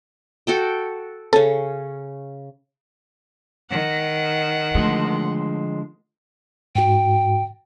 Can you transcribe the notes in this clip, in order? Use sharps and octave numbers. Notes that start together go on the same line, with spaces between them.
F#4 A4 G5
C#3 C#4 A4
D#3 F#5
D3 F3 G#3 A3
G#2 F#4 G5